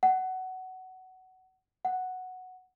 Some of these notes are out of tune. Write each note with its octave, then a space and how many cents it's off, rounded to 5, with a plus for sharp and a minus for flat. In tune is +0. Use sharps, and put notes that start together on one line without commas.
F#5 +15
F#5 +0